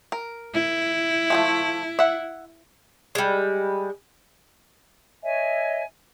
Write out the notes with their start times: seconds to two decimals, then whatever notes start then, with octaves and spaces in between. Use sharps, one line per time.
0.12 A#4
0.54 E4
1.30 F3 G#3 A3
1.99 E5 F#5
3.15 G3 G#3
5.24 C#5 D#5 E5 G#5